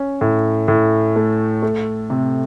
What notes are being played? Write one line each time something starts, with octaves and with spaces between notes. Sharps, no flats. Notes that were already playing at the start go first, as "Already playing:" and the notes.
Already playing: C#4
A2
A2
A3
A3
C3